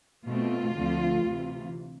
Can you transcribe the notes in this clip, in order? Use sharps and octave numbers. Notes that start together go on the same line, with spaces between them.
B2 A3 C4 F4
D2 D3 F3 A3 C4
D2 C3 E3